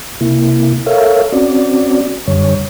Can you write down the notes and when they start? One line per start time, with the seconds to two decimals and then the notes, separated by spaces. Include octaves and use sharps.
0.21 C3 A#3 E4
0.86 A4 A#4 C#5 E5 F5
1.32 C4 C#4 F#4 D5
2.27 F#2 D3 G3 C#5